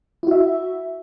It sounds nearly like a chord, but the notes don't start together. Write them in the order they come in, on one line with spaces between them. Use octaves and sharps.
E4 F#4 E5